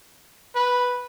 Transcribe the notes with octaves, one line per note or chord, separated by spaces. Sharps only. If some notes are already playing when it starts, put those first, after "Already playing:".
B4